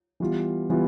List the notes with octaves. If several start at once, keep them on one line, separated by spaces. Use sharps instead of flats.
E3 G3 B3 F4
E3 G3 B3 F4